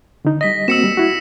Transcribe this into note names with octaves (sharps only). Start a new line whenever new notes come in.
D3 D#4
G3 D#5 A#6 B6
A#3 C4 F#4 E6 C#7 E7
G3
E4 F#4